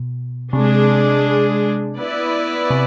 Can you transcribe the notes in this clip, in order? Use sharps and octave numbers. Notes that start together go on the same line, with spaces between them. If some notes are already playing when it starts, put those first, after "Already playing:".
Already playing: B2
C3 G#3 D4 G#4
B3 E4 B4 D5
C3